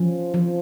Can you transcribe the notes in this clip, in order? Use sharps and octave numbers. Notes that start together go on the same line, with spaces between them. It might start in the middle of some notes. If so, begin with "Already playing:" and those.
Already playing: F3 C#4
F3